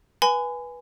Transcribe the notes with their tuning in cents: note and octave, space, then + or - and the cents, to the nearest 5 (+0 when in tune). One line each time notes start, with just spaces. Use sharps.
B4 -15 G#5 +0 B5 +40